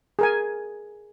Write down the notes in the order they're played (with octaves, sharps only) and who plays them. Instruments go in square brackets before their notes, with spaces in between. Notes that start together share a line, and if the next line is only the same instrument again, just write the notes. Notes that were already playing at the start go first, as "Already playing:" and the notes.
[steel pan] G#4 A#4 G#5